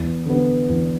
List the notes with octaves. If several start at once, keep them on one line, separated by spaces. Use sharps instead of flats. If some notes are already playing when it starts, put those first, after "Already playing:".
Already playing: E2
D3 B3
E2